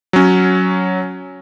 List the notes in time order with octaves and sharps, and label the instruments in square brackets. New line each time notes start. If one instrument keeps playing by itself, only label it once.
[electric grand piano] F#3 C#4